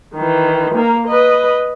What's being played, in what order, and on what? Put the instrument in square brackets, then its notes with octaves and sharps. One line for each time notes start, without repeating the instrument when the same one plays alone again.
[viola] D#3 E3
A#3 A#4
B4 D#5